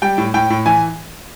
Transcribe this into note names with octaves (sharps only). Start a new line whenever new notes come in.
G3 G5
A2
A2 G5
A2
E3 G#5